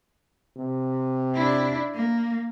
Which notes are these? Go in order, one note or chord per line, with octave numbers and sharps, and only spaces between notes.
C3
D4 E4
A#3